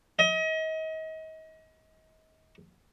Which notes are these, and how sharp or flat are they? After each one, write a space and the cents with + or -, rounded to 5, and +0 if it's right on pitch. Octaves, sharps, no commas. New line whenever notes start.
D#5 +35